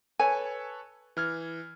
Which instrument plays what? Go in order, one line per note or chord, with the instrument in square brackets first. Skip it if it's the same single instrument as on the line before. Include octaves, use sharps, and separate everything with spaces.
[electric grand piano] A4 B4 C#5 [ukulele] G#5
[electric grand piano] E3 F6 G#6